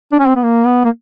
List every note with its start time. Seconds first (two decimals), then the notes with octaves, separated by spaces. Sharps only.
0.12 D4
0.19 C#4
0.27 C4
0.36 B3
0.43 A#3
0.66 B3
0.84 A#3